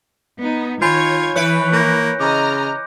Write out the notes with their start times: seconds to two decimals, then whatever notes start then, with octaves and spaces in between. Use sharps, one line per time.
0.41 B3 D#4
0.82 D#3 F4 C#5 G#5 B5 G6 G#6
1.36 E3 E4 B4 C#5 F#6 C#7 D7
1.73 A#3 F#6 G6 A#6
2.20 C#3 D#5 A#5 D6 F6 G6